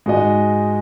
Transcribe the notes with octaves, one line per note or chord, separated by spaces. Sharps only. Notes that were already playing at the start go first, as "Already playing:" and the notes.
G#2 G#3 F#4 D#5